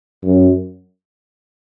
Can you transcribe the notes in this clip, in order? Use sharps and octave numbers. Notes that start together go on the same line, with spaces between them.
F#2